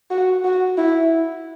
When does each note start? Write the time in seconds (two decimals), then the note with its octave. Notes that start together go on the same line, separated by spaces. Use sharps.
0.11 F#4
0.44 F#4
0.78 E4